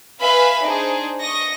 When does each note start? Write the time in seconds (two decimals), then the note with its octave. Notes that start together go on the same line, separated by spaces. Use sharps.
0.20 B4 E5 F5 G#5 B5
0.64 D4 D#4 G#4 C5
1.21 D#5 C#6 A#6